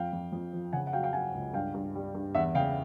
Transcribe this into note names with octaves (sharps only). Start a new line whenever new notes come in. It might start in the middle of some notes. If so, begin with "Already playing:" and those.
Already playing: F2 F5 G5
F2
F2
F3
C#3 F#5 G#5
F#5
F#3 F5 G5
F5 G5
F#3 F#5 G#5
C#2
G2 F5 G5
G2
G3
G2
E2 E5 F#5
C#3 F5 G5